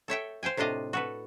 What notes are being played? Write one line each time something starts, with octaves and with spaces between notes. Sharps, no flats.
A4 C#5 E5 G5
C5 F5 G5 G#5
A2 C3 D4 F4 D#5 F5
F#4 A4 B4